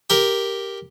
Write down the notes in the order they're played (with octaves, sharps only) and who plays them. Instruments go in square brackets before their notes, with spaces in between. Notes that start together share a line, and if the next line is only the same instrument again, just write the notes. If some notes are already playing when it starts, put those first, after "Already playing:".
[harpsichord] G4 A#4